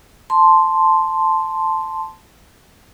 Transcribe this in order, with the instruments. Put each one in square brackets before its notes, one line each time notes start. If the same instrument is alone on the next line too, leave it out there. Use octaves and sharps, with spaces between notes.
[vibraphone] A5 C6